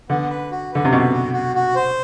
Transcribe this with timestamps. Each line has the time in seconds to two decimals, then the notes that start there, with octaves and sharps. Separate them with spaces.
0.09 D3 B3
0.30 B4
0.51 F#4
0.72 D3 B4
0.85 C3
0.92 B2 B4
1.13 F#4
1.33 F#4
1.55 F#4
1.75 C5